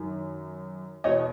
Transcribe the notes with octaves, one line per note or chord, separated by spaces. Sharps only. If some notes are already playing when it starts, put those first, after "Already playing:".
Already playing: F#2 D#3
E2 B2 C#5 D#5